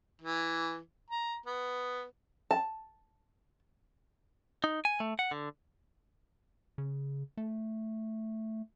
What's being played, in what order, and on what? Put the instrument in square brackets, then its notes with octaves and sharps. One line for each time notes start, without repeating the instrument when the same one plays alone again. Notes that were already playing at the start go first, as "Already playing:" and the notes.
[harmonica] E3
A#5
B3
[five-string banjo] A5
[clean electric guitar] D#4
G#5
A3
F#5
D3
[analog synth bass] C#3
A3